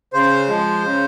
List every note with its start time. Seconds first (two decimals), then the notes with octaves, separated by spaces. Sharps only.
0.13 C#3 C5
0.48 F3 G#3
0.83 C#3